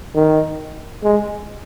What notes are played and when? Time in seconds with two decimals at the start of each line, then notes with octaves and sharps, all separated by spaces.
0.15 D#3
1.03 G#3